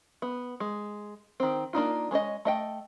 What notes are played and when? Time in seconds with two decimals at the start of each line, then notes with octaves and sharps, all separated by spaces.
0.22 B3
0.60 G#3
1.40 D#3 C4
1.73 A#3 D4 D#4 F4
2.11 G#3 C#4 C5 D#5
2.45 A3 D#5 G5